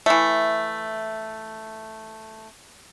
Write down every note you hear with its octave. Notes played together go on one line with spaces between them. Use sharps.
E3 A3